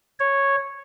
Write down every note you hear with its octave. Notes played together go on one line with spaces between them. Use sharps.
C#5